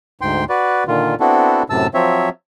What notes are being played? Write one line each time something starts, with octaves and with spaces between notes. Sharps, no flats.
D2 G#2 G5 C6
F#4 B4 D5
A#2 D3 D#3 F4
B3 C4 D4 E4 F#4 A4
F#2 A2 C3 A5 E6
F3 F#3 C4 C#5 E5